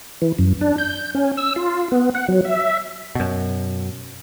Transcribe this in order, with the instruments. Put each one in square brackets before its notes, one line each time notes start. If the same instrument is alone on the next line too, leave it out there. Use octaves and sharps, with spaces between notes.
[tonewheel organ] E3
F#2
D4
G6
C#4
E6
F4
B3
F#5
F#3
E5
[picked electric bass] F#2 B2